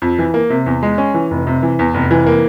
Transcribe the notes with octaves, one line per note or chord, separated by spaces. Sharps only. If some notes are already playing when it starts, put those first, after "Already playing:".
F2
E3
A#3
C3
E2
G#3
C#4
E3
F1
C3
E3
E2
F1
E3
A#3